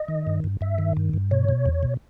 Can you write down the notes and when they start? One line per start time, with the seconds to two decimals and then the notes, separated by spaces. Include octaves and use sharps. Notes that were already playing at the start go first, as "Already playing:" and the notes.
Already playing: D#5
0.08 D#3
0.27 G2
0.44 G2
0.61 G2 E5
0.78 D#3
0.97 G2
1.13 G2
1.31 B2 C#5
1.49 B2
1.66 E2
1.83 B2